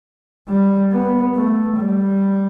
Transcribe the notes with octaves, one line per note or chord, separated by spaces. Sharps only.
G3
B3
A3
G3